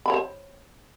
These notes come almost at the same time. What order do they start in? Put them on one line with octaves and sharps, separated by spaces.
B5 C#5 C5